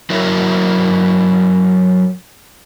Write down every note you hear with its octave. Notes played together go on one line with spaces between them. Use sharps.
F#3 E4 A#4 C#5 E5